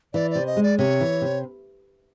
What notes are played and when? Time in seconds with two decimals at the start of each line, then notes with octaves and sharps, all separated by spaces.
0.14 E3 D5
0.31 C3 D5
0.46 D#5
0.57 G#3
0.63 D5
0.78 C3 C#5
1.00 E3
1.22 C3